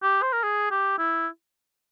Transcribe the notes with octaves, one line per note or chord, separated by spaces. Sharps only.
G4
C5
A#4
G#4
G4
E4